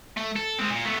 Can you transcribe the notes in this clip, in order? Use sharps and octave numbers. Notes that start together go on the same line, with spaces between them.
A3
A4
G#3 C4
A#2
A3 B3